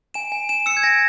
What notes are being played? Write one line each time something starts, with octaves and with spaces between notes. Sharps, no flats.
G#5 E7
G#5
G#5 E7
E6 C#7
G#6
G#5 A#6